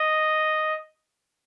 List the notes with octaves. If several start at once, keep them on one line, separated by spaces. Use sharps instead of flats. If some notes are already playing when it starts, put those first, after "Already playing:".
Already playing: D#5